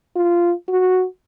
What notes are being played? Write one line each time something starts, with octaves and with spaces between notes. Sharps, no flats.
F4
F#4